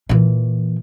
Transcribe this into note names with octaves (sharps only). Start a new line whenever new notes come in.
A#2 E3